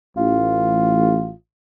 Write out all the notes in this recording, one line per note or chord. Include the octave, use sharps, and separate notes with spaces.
A1 F4